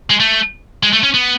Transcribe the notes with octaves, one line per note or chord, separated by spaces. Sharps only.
G#3
A3
G#3
A3
C#4
B3